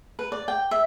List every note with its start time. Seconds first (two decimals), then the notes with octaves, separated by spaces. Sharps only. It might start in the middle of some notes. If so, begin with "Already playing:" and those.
0.19 B4
0.32 D5
0.48 G5
0.71 E5